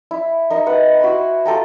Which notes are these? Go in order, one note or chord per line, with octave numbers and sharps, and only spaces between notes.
E4
D#4 A#4 D#5 E5
B4 F#5
E4 F#4 B5 C6
F4 A4 G5 A#5